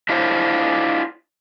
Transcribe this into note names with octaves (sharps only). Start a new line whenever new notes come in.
D4 E4 F4 C5 C#5